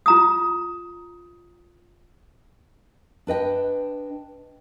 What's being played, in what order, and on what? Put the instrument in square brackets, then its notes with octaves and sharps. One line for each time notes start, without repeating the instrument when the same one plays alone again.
[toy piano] F4 A#5 D#6
[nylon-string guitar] D4 B4 D#5 G5